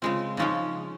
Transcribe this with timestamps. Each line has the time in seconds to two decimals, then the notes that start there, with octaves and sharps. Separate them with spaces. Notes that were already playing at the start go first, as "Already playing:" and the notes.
0.02 C#3 G#3 C4 F4
0.37 C#3 F3 G#3 C#4 D#4